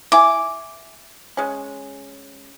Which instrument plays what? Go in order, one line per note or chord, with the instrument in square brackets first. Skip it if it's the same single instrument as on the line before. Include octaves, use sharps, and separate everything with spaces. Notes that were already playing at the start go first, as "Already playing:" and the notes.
[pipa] E4 G#5 [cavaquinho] D6
[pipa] G#3 C#4